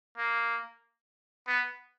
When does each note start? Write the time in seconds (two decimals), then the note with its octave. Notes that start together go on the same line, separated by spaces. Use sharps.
0.18 A#3
1.48 B3